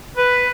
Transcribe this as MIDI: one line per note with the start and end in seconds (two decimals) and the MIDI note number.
0.17 0.50 71